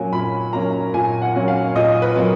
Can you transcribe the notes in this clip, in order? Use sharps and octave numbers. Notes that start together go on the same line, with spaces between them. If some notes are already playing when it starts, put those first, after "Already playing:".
Already playing: A#2 F#3 A#3 C#4 G#5
A#2 B5
F#3 A#3 C#4 A#5
A#2 G#5
F#5
F#3 A#3 C#4
F5
A#2 D#5
B4
F#3 A#3